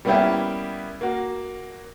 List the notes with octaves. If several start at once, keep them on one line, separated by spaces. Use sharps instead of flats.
G3 A#3 B3 C#4 E4 G4
A#3 F#4